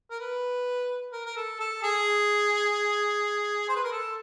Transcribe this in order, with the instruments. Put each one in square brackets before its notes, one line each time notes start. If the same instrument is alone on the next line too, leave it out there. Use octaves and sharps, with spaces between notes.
[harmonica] A#4
B4
A#4
A#4
A4
A4
G#4
C5
B4
A#4
A4